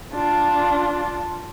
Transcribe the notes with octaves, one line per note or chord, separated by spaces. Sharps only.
D4 F4